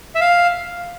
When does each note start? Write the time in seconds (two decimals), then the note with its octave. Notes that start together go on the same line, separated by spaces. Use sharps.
0.15 E5
0.21 F5